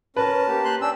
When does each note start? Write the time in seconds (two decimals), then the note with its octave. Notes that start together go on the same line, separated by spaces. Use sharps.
0.17 C#4 A#4 B4 A5
0.48 A#3 G4
0.65 G4 C6 F#6
0.81 C#4 D4 E6